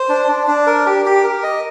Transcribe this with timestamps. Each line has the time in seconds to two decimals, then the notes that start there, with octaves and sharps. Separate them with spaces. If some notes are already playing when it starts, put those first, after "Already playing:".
Already playing: C5
0.09 D4
0.28 D4
0.47 D4
0.67 A#4
0.86 G4
1.06 G4
1.24 A#4
1.43 D#5